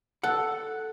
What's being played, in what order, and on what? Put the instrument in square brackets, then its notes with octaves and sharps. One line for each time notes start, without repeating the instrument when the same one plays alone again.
[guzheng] A4 [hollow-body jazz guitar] F#5